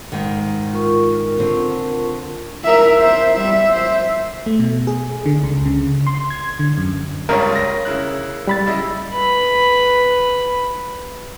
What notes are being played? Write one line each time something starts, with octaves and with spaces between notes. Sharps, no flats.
G#2 D#3
F4 A#4 C#6
D3 C4
A#4 E5
C5 E5
G3 E5
C5 E5
A3
B2
G#4
D3
C#2
C#3
C6
G#6
D3
F#2
G1 C#2 G2 A#4 C#5
A#6
C#3 E4 F#6
G3 B5 A6
C#3 E4 D#5
B4 B5